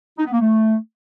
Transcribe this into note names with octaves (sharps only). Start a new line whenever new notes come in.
D#4
B3
A#3
A3